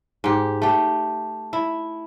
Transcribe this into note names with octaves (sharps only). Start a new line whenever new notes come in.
G#2 G4
A3 G4
E4